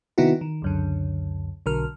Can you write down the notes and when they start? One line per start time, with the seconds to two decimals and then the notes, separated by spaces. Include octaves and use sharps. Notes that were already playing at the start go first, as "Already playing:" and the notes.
0.18 C3 D#3 B3 D#4 E4 F#4
0.41 D#3
0.62 C#2 F#2 D3
1.66 B1 D3 A#4 F6